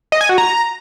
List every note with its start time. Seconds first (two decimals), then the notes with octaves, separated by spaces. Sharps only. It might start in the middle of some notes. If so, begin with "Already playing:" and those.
0.12 D#5
0.21 G#5
0.29 F#4
0.38 A#5